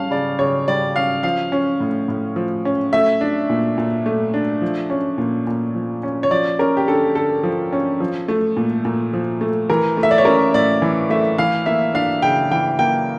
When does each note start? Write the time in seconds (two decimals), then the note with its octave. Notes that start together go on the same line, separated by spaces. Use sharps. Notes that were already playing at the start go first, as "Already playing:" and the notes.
Already playing: G3 C#4 F5 A5
0.11 C#3 D5
0.39 C#3 C#5
0.68 G3 D5
0.95 C#4 F5
1.23 F3 F5
1.52 C#4
1.80 A2
2.08 A2
2.36 F3
2.65 C#4
2.93 A3 E5
3.21 D4
3.50 A#2
3.78 A#2
4.06 A3
4.34 D4
4.61 F3
4.90 C#4
5.18 A#2
5.47 A#2
5.75 F3
6.03 C#4
6.23 C#5
6.31 F3 D5
6.59 C#4 A#4
6.77 G4
6.88 D3 A4
7.15 D3 A4
7.43 F3
7.73 C#4
8.00 F3
8.28 A3
8.57 A#2
8.85 A#2
9.13 F3
9.41 A3
9.70 E3 A#4
9.97 A3
10.03 E5
10.11 D5
10.18 C#5
10.25 C#4 A#4
10.54 A2 D5
10.82 E3
11.10 A3 E5
11.38 E3 F5
11.66 A#3 E5
11.94 D4 F5
12.22 C#3 G5
12.51 E3 G5
12.79 A#3 G5